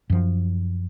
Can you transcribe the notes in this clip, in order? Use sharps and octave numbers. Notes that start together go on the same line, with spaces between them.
F#2 F3